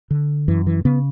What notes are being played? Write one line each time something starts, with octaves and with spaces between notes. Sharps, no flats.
D3
F#2 E3
E3
C#3 B3